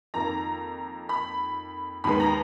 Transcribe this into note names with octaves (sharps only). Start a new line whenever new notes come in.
F2 D#3 A#3 A#5
B5
D#2 D#3 G#3 B3 B5
A#5